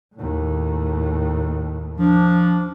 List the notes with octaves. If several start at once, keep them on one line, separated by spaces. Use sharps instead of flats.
D#2 A2
F3 D4